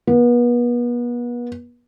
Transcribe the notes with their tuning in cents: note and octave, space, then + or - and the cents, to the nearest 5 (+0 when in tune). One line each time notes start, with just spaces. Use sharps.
B3 -35